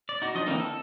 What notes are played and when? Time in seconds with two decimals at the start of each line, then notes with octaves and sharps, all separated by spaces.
0.09 D5
0.22 D#4 F#4
0.35 F3 D4 D#5
0.46 D3 E3 A#3 C4 D#4
0.60 A4